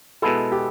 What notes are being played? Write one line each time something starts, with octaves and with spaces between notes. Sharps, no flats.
B2 G#3 B3 E4 A4
G4